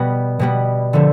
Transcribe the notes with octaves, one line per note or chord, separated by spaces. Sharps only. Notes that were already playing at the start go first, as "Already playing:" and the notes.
Already playing: B2 G3 B3
B2 G3 B3
D3 F3 A3